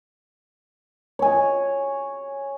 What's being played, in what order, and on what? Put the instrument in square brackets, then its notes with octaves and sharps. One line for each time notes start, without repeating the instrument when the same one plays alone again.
[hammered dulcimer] C#5 G#5